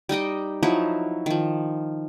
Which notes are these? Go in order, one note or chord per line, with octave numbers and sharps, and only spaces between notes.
G3 D#4 D#5 G5
F3 F#3 D#4 E4
D#3 F3